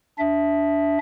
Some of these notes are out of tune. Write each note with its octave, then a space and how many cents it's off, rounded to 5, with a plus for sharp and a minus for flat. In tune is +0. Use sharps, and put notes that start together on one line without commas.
D4 -15 E5 +0